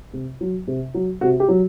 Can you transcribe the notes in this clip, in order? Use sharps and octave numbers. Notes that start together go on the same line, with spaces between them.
C3
F#3
C3
F#3
C3 F#4
G4
F#3